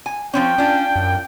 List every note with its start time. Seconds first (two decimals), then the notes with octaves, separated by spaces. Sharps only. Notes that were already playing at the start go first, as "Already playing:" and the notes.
0.06 G#5
0.34 F3 C4 C#4 G5
0.58 C#4 D4 F4
0.96 F#2